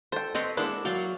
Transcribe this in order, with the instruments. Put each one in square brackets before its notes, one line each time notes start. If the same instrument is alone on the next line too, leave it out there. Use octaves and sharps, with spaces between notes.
[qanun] A4 [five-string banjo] C5 G5
[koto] C4 B4 G5 [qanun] C#5 [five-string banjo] D#5
[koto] G#3 B3 [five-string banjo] A#3 D4 E4
[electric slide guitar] F#3 F#4 [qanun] C#5 D5 F5 [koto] G5